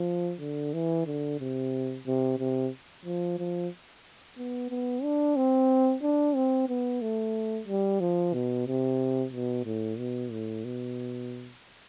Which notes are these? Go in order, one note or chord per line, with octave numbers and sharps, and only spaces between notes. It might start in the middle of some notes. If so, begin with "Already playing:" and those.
Already playing: F3
D3
E3
D3
C3
C3
C3
F3
F3
B3
B3
D4
C4
D4
C4
B3
A3
G3
F3
B2
C3
B2
A2
B2
A2
B2